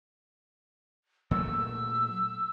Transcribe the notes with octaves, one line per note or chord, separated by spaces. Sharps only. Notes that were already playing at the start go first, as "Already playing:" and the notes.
A#2 F#3 A3 E6